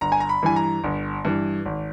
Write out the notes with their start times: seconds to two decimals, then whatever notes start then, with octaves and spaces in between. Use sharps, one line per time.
0.01 G1 A#5
0.12 G#5
0.20 A#5
0.29 B5
0.43 G2 E3 G#5
0.56 A#5
0.84 G1
1.25 G2 E3
1.65 G#1